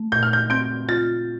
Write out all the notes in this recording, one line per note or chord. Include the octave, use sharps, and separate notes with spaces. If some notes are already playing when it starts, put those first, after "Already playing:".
Already playing: A3
A#2 G6
F6
G6
C4 G6
F4 A6